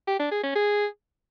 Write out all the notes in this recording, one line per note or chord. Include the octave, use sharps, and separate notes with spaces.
G4
D4
G#4
C#4
G#4